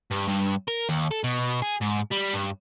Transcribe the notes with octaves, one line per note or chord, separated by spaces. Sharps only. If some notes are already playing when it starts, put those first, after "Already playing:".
G2
G2
A#4
D#2
A4
B2
G#4
G#2
G3
G2